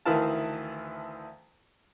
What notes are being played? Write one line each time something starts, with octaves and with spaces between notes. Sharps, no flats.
D2 D#3 E3 E4 F5 A5